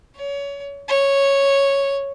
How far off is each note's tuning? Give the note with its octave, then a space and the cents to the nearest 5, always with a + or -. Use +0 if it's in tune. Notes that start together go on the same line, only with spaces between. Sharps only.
C#5 +25
C#5 -5